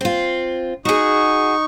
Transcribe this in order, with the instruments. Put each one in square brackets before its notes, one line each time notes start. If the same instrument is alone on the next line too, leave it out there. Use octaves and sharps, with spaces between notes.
[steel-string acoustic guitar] C4 F4
[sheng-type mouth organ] D#4 C#6 [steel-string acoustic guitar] F#4 G#4